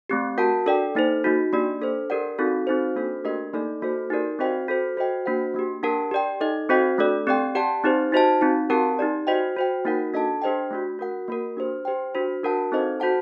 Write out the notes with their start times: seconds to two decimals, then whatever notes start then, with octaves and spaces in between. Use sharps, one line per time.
0.09 A3 C4 G4
0.38 F#4 A#4 F#5 A5
0.66 D4 A4 D5 G5
0.95 A#3 D#4 A4 C5
1.24 A#3 D#4 F#4
1.53 A#3 D4 G4 D5
1.81 D4 A4 C5
2.10 D4 G4 A#4 D5 F#5
2.39 C4 D#4 F#4 A4
2.67 C4 D#4 F#4 C5
2.96 A#3 D4 F#4 A4 C5
3.25 A3 D4 G4 A#4 D#5
3.53 A#3 D#4 A4 D5
3.82 A#3 F#4 A4 C5
4.10 D#4 G4 A#4 D5
4.39 C4 F#4 C5 D#5 G5
4.68 F#4 A4 C5
4.97 F#4 C5 D#5 G5
5.26 A#3 D4 F#4 C5 F#5
5.54 A#3 D4 G4
5.83 D4 G4 A#4 F#5 A5
6.11 G4 D5 G5
6.41 D#4 A4 D#5
6.69 C4 F#4 C5 D#5 G5
6.98 A3 D4 A4 D5
7.27 C4 G4 D5 G5
7.55 G4 D5 F#5 A5
7.84 C4 D#4 G4 C5
8.12 D#4 F#4 C5 D#5 A5
8.41 C4 D#4 F#4
8.70 C4 G4 A#4 F#5 A5
8.99 D#4 G4 D5
9.27 F#4 C5 D#5 G5
9.56 F#4 C5 G5
9.85 A#3 D#4 F#4 A#4 F#5
10.14 D4 A4 D#5 A5
10.42 D4 G4 C5 D#5 G5
10.71 A3 D4 F#4
10.99 F#4 A#4 F#5
11.28 A#3 F#4 A#4
11.57 D4 G4 C5
11.85 G4 C5 G5
12.15 D4 F#4 C5
12.43 D4 F#4 A#4 F#5 A5
12.72 C4 D#4 A4 C5 D#5
13.00 F#4 C5 F#5 A5